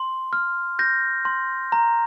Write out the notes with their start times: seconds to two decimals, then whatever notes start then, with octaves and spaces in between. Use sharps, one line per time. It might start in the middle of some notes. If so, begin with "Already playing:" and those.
Already playing: C6
0.33 F6
0.79 G6 A#6
1.25 C6
1.72 A#5